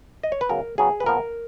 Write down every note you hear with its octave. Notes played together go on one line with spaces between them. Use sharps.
D#5
C#5
B4
C#3 F#3 B3 A#4
C#3 F#3 B3 G#4
B4
A#2 F3 B3 A#4